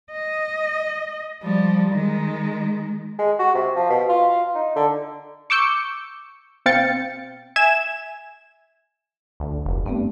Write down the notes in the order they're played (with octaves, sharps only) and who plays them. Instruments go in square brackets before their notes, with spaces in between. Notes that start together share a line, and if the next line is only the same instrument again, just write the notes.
[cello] D#5
F3 G3
D#3 G#3
[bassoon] G#3
F#4
C3
F3
B2
F4
D#4
D3
[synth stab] C#6 D6 E6 G6 C#7
B2 C4 F5 G5 A6 C#7
E5 G#5 G#6 E7
[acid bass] D2
F1
[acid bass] G2 [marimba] A3 B3 C4